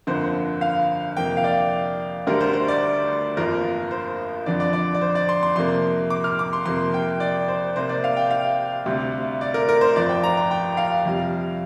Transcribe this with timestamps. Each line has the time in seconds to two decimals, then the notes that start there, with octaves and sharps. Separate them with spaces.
0.07 G1 F2 D3 A#3 C5
0.61 F5
1.17 F2 C3 A#3 G5
1.37 F5
1.44 D5
2.27 D2 D3 G3 A#4
2.41 C5
2.53 C5
2.68 D5
3.37 G1 F2 F3 A#3 A#4
3.91 C5
4.46 F2 D3 F3 D5
4.60 D5
4.73 D5
4.95 D5
5.01 C5
5.15 D5
5.29 C6
5.43 C6
5.56 F2 C3 A#3 C6
6.10 D6
6.24 F6
6.39 D6
6.53 C6
6.66 F2 C3 A#3 C6
6.94 G5
7.20 D5
7.48 C5
7.76 C2 C3 A#3 C5
7.89 D5
8.04 F5
8.17 G5
8.30 F5
8.86 D2 C3 G3
9.41 D5
9.54 A#4
9.69 A#4
9.81 C5
9.96 G1 F2 F3 D5
10.09 G5
10.24 A#5
10.37 A#5
10.51 G5
10.77 F5
11.05 F2 C3 G3